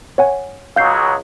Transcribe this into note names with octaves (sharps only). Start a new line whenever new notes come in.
C#5 F#5 G#5
C#2 C#3 F#3 F5 G6 C7